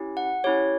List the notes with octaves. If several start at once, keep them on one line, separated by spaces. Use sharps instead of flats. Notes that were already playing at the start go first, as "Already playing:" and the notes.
Already playing: C#4 E4 G4
F#5
C#4 E4 G4 C#5